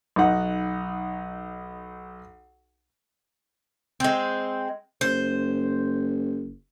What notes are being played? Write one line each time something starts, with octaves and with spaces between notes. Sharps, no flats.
B1 D#4 F#5
G#3 C4
F#1 C5